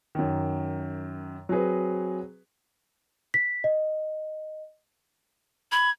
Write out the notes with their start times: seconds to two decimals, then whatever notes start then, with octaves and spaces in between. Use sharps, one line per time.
0.15 F#2 D#3
1.49 F#3 C4 F#4 G#4 B4
3.34 B6
3.64 D#5
5.72 B5 G#6